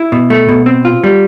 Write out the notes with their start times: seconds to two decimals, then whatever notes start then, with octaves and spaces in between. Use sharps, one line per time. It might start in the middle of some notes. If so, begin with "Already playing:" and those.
Already playing: E4
0.12 B2
0.30 A3
0.49 B2
0.66 C4
0.85 F4
1.04 G3